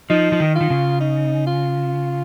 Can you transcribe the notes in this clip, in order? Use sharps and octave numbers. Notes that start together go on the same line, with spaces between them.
F3 D#4
F3
D#3
F4
D#3
C#3
D#4
F4